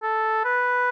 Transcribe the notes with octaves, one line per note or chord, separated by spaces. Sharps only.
A4
B4